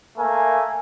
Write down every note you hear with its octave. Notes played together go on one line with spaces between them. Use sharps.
A3 A#3 E5 G#5